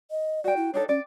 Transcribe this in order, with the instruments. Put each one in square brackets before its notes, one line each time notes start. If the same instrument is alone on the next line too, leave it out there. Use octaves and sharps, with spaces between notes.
[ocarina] D#5
[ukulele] F#4 G5 [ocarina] D5
[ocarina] E4
[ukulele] D4 D#4 A4 [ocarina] C#5
[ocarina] C#4 [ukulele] D5